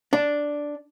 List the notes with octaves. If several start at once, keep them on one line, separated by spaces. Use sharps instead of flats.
D4